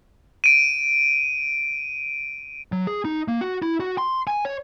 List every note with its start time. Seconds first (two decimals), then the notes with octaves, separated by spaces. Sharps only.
0.44 D7 D#7
2.72 F#3
2.87 G#4
3.05 D#4
3.28 A#3
3.41 F#4
3.62 E4
3.80 F#4
3.98 C6
4.27 G#5
4.45 C#5